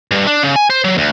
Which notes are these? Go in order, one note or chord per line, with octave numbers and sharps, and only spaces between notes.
G2
D4
C#3
G#5
C5
F#3
D2